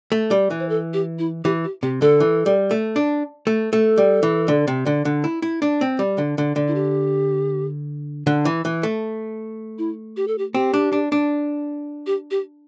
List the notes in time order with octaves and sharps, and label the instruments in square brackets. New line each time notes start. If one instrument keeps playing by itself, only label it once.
[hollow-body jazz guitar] A3
G3
E3
[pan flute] C5
A4
G4
E4
[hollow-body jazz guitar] E3 [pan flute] G4
[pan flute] G4
[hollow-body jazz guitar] C3 [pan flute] G4
[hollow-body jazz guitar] D3 [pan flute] A4
[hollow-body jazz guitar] E3
G3
A3
D4
A3
[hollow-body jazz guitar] A3 [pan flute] A4
[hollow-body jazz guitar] G3
E3
D3
C3
D3
D3
E4
E4
D4
C4
G3
D3
D3
D3
[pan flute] E4
G4
[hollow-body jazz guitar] D3
E3
E3
A3
[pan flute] E4
G4
A4
G4
[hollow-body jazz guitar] C4 [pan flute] G4
[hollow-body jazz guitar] D4
D4
D4
[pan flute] G4
G4